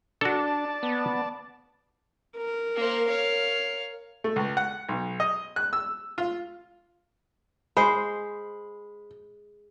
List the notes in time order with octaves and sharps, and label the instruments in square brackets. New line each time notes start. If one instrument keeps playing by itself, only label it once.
[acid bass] D4 [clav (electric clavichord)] F#4 A4 [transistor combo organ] D5 A5
[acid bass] B3
[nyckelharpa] A#4
[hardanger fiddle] A#3 C5
C#5 F5
[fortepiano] A3
C#2
F#5
B1
D#5
F#6
E6
F4
[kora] G#3 C5 [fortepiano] B5